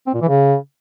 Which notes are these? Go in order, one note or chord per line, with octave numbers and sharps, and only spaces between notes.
C4
A#2
E3
C#3